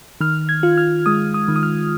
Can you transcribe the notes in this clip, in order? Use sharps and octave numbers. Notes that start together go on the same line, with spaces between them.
D#3 F6
G#6
F4
F6
G#3 D#6
D#6
D#3
D#6
F6